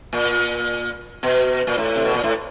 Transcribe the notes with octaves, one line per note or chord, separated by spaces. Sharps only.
A#2
B2
A#2
A2
C3
B2
A#2
A2